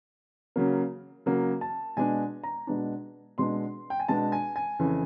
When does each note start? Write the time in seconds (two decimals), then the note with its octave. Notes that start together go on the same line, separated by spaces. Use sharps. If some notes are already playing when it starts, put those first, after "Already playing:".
0.56 C#3 F#3 A#3
1.26 C#3 F#3 A#3
1.61 A5
1.97 B2 G#3 B3 D4 G#5
2.43 A#5
2.67 B2 G#3 B3 D4
3.38 B2 G#3 B3 D4 C6
3.90 G5
4.00 G#5
4.08 B2 G#3 B3 D4 A5
4.32 G#5
4.56 G#5
4.79 F2 C#3 E3